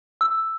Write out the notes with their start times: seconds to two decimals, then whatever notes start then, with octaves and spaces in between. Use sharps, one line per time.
0.21 E6